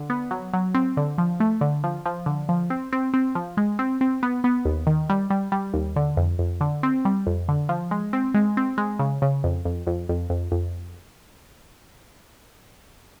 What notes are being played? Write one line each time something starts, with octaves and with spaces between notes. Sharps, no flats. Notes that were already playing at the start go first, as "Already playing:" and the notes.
Already playing: D3
B3
F#3
F#3
C4
D3
F3
A3
D3
F3
F3
D3
F3
C4
C4
C4
F3
G#3
C4
C4
B3
B3
D#2
D#3
G3
G3
G3
D#2
D3
F2
F2
D3
C4
G3
F2
D3
F3
G#3
C4
G#3
C4
G#3
C#3
C#3
F2
F2
F2
F2
F2
F2